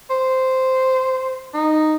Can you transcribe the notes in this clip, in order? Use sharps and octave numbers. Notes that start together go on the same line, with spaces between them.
C5
D#4